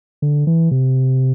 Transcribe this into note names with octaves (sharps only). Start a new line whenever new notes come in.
D3
E3
C3